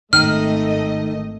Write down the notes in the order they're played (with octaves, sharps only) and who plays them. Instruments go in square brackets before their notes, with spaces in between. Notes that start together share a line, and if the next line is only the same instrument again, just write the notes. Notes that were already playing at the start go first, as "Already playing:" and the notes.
[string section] G#1 A3 D#5 [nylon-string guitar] D#3 [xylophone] F6